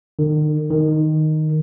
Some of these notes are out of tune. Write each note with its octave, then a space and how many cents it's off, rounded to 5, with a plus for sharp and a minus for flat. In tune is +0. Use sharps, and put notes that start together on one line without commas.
D#3 -45
D#3 -5